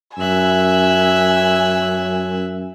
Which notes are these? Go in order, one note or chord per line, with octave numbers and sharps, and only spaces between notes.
F#2 E5 G#5 E6 F#6